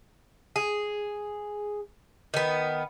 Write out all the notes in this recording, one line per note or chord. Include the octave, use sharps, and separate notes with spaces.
G#4
D#3 B3